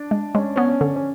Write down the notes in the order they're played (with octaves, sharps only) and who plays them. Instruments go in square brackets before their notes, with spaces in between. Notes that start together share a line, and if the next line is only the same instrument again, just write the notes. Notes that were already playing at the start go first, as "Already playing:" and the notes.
Already playing: [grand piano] D4
[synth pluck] G#3
[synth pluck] G#3 [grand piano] C#4
[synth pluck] B3 [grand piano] C#4
[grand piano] C#4
[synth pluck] D3
[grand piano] C#4